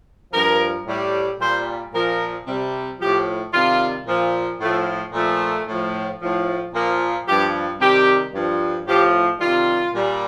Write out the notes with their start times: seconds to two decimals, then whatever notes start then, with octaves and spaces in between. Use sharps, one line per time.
0.33 G2 F3 A#4
0.86 A2 G3
1.40 A#2 G3 C5
1.93 A#2 F3 A#4
2.47 C3 G3
2.99 A2 F3 G4
3.53 C3 D#3 G3 F4
4.06 A#2 F3
4.59 A2 F3 A3
5.13 A#2 F3 A3
5.66 A2 F3
6.20 A2 F3
6.73 A#2 F3 A#3
7.26 G2 F3 G4
7.80 C3 D#3 G3 G4
8.33 G2 F3
8.86 A2 F3 G4
9.40 C3 D#3 G3 F4
9.94 A#2 G3